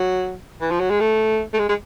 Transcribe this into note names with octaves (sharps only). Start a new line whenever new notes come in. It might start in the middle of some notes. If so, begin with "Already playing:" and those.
Already playing: F#3
E3
F3
F#3
G#3
A3
A3
G#3
G#3